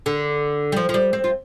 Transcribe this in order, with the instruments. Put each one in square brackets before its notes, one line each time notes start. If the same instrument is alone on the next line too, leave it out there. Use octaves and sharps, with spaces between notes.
[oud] D3
G3
F3
F3
G3
C4
F4